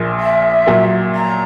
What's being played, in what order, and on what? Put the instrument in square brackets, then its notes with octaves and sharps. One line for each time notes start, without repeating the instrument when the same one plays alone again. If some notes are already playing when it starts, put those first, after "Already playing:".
Already playing: [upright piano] A#1 A#2 A#3
[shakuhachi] E5
[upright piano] A#2 F#3 A#3
[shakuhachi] A#5